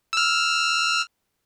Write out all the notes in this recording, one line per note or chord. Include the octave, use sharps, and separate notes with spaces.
E6 F6